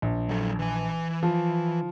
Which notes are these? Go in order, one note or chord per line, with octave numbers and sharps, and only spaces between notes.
A#1
F#3 A4
E3 G#5
F3